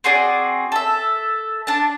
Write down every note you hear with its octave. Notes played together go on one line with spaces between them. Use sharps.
C4 F#4 G#4 D5
A4 E5
D4 A5